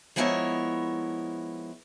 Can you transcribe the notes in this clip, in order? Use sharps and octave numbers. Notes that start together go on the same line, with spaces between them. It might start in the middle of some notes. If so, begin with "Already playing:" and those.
F3 G#3 B3 E4 A#4 C#5